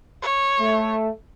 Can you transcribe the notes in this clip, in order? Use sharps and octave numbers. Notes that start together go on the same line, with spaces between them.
C#5
A3